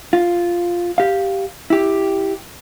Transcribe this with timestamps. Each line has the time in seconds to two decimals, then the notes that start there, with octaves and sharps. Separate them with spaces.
0.13 F4
0.98 G4 F5
1.70 E4 G4